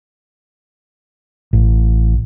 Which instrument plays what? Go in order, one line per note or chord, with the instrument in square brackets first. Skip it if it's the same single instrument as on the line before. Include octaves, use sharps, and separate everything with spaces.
[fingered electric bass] A1